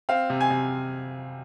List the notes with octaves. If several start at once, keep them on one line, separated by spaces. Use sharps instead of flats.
C4 F5
C3
G#5
C3